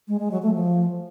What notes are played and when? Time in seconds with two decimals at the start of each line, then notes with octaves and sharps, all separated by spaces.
0.08 G#3
0.20 G#3
0.31 F#3
0.43 A3
0.54 F3